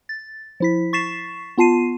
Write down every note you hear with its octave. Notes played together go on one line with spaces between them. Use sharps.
A6
F3 E4 B6
C#6 A6 B6 C7 E7
B3 F4 A5 C7 D#7